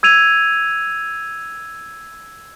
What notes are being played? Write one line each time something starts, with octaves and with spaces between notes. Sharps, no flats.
E6 G#6 D#7 F7